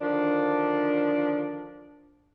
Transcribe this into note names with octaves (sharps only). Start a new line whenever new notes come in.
D3 D#3 F3 D4